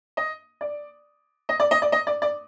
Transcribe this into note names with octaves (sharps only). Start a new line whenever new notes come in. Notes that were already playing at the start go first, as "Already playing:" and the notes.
D#5
D5
D#5
D5
D#5
D5
D#5
D5
D5